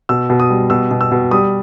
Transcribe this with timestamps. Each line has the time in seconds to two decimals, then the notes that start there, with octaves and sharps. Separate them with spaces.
0.09 B2 E6
0.30 B2
0.40 D#6
0.50 G3
0.70 B2 E6
0.91 B2
1.01 E6
1.12 B2
1.31 G3 D#6